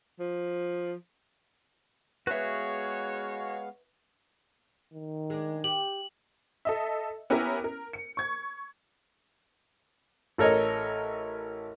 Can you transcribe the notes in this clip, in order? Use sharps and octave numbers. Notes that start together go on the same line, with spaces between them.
F3
G#3 B3 F#4 G#4 B4 C#5 E5 F5
D#3
G#3 D4
G4 F#7
A4 D#5 E5
B3 C#4 E4 G4 A#4
A#4
C#7
C#6 G#6
A1 A4 A#4 C#5 D#5